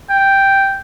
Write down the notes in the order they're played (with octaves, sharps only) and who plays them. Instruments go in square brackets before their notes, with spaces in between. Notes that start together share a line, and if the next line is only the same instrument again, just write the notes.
[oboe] G5